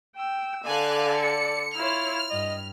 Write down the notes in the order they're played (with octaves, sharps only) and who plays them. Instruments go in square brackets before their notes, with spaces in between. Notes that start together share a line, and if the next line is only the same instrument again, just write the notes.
[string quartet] G5 E6
[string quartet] D3 A4 [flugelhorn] D5 [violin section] F5 G#5 F#6
[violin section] C#7
[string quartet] E4 F4 C#5 [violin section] F6
[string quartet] G2 [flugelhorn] D#5